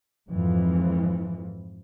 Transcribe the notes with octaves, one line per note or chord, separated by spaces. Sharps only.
F2 G#2 E3 F3